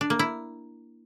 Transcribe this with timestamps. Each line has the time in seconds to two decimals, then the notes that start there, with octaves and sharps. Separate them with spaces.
0.01 D4
0.10 A#3
0.19 E4